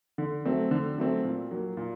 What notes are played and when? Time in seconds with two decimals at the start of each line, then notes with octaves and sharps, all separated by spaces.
0.18 D3
0.45 F#3 A3 C4
0.71 D3
0.98 F#3 A3 C4
1.24 A#2
1.51 F#3 A#3
1.77 A#2